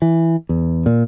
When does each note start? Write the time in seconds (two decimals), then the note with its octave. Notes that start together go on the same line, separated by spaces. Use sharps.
0.02 E3
0.49 E2
0.86 A#2